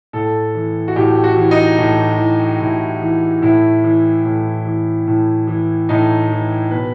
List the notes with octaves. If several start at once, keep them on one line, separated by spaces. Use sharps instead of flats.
A2 A4
E3
F#4
A2 G4
F#4
E3
D#4
A2
E3
A2 E4
E3
A2 E4
E3
A2
E3
A2
E3
A2 D#4
E3
B2 B4